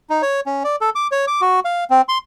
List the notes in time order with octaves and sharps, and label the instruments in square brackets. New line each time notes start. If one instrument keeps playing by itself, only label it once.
[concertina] D#4
C#5
C#4
D5
A4
D6
C#5
D6
F#4
F5
C4
C6